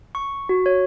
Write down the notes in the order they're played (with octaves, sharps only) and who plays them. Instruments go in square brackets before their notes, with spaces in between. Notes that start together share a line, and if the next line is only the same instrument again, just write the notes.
[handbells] C#6
F#4
C#5